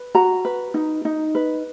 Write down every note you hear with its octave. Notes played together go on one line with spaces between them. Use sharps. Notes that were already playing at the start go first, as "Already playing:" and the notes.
Already playing: B4
F#4 A#5
B4
D#4
D#4
B4